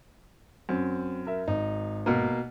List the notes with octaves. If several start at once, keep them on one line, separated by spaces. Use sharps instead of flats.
F#2 C4
A#4 E5
G#1 D#4
B2 A#3